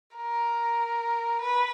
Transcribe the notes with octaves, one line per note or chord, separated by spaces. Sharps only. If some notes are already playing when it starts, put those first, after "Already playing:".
A#4
B4